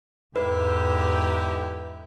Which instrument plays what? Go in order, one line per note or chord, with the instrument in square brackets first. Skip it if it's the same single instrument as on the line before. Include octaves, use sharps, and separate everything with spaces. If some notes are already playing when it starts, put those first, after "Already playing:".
[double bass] E2 G#2 [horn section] D3 D#4 G4 [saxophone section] E4 [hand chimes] B4